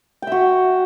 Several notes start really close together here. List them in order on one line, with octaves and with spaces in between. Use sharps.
G5 E5 F#4